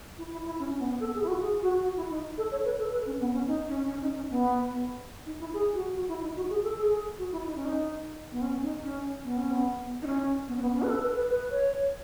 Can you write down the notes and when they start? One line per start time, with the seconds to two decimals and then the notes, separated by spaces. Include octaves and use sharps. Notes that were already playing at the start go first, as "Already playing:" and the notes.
0.18 E4
0.32 E4
0.46 E4
0.59 C#4
0.69 C#4
0.80 B3
0.90 B3
1.00 A4
1.14 G#4
1.23 E4
1.28 F#4
1.41 G#4
1.62 F#4
1.83 F#4
1.96 E4
2.10 D#4
2.38 A4
2.51 C#5
2.65 B4
2.79 A4
2.93 B4
3.06 C#4
3.20 B3
3.34 C#4
3.47 D#4
3.68 C#4
3.89 C#4
4.02 D#4
4.16 C#4
4.30 B3
5.26 D#4
5.40 E4
5.53 G#4
5.74 F#4
5.95 F#4
6.08 E4
6.22 D#4
6.36 F#4
6.50 G#4
6.63 A4
6.77 G#4
7.18 F#4
7.32 E4
7.46 D#4
7.56 C#4
7.65 D#4
8.32 B3
8.42 C#4
8.63 D#4
8.83 C#4
9.24 B3
9.38 C#4
9.51 B3
10.02 D#4
10.07 C#4
10.48 B3
10.57 C#4
10.62 B3
10.76 C#4
10.83 B4
10.89 A4
11.03 B4
11.17 B4
11.30 B4
11.51 C#5